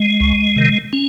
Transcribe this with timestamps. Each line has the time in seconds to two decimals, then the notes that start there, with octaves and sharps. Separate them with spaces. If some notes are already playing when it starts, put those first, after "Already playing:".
Already playing: G#3
0.20 C#2
0.56 C3 D#3
0.93 C#4